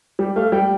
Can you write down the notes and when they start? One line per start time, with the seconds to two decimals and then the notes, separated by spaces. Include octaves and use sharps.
0.19 G3 G4
0.36 A3 F5
0.52 G3 G5